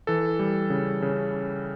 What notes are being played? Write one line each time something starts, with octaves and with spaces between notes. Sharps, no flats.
E3 A4
G3
C#3
C#3